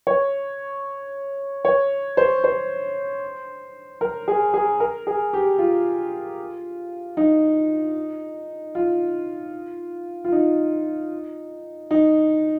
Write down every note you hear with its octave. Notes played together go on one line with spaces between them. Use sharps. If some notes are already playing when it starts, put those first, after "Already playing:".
C#5
C#5
C5
C5
A#4
G#4
G#4
A#4
G#4
G4
F4
D#4
F4
F4
D#4
D#4